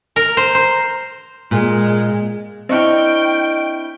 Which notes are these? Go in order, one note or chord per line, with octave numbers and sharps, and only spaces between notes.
A#4
C5
C5
A#2 G#3
C4 D4 E4 D#5 G5 C#6 F6